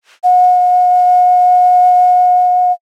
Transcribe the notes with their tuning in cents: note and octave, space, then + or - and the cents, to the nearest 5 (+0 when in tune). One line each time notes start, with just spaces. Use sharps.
F#5 -40